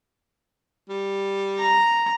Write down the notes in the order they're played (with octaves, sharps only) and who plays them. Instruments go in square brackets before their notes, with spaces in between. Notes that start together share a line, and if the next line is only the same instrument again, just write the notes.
[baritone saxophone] G3
[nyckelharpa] A#5